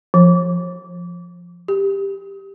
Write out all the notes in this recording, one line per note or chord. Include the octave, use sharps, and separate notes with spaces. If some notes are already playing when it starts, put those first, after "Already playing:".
F3
G4